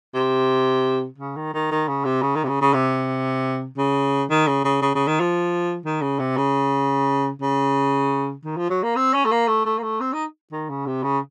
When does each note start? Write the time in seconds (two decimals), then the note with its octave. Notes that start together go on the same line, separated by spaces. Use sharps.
0.14 C3
1.18 C#3
1.37 D#3
1.54 D#3
1.71 D#3
1.88 C#3
2.05 C3
2.22 C#3
2.36 D#3
2.44 C3
2.49 C#3
2.62 C#3
2.74 C3
3.77 C#3
4.30 D#3
4.48 C#3
4.65 C#3
4.82 C#3
4.95 C#3
5.07 D#3
5.20 F3
5.86 D#3
6.02 C#3
6.19 C3
6.37 C#3
7.41 C#3
8.44 D#3
8.57 F3
8.70 F#3
8.83 A#3
8.96 C4
9.14 C#4
9.25 A3
9.32 A#3
9.48 A3
9.66 A3
9.78 A#3
9.83 A3
10.00 C4
10.13 D#4
10.52 D#3
10.70 C#3
10.87 C3
11.03 C#3